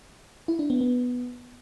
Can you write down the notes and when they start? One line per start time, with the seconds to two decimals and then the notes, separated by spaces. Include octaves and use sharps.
0.48 E4
0.59 D4
0.70 B3
0.81 B3